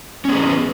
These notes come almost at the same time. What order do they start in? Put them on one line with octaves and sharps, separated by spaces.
C#4 B3 G#4 B4